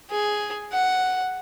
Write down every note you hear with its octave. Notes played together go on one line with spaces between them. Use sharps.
G#4
F#5